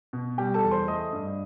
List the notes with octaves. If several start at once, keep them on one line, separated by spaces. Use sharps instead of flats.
B2
G3 G4 G5
A4 A5
E2
C5 C6
A3 D#5 D#6
G2